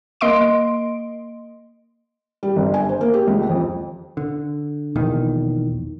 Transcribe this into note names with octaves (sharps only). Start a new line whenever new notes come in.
A#3 D#5 C6 D7
G3
G1
G#5
C5
A#3
G4
C#2
F2
D3
E1 A#1 E2 D#3